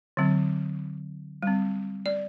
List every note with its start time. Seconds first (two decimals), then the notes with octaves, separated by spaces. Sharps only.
0.17 D3 F#3 C4
1.43 G3 C4
2.06 D5